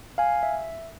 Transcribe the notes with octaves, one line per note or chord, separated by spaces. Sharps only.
F5 G#5
E5